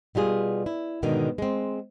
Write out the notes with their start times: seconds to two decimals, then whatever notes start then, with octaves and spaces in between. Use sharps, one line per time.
0.15 B2 G3 F4 G#4
0.66 E4
1.03 G#2 B2 D3 D#3
1.38 G#3 C4